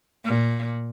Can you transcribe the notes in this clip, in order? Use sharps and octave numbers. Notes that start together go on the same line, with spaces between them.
A#2